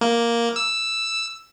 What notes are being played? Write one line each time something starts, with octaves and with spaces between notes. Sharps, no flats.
A#3
E6